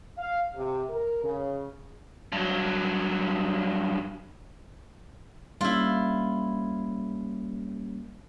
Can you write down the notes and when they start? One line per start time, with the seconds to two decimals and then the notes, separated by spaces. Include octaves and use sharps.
0.18 F5
0.55 C3
0.90 A#4
1.24 C#3
2.32 G2 F#3
5.61 G3 A#3 C#4 E4 F4